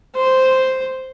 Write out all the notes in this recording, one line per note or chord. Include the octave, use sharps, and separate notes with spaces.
C5